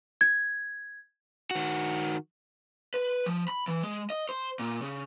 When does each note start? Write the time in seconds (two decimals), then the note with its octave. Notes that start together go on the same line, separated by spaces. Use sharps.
0.21 G#6
1.51 D#3 F#4
2.94 B4
3.26 F3
3.48 B5
3.68 E3
3.83 G#3
4.10 D#5
4.29 C5
4.59 A#2
4.81 C#3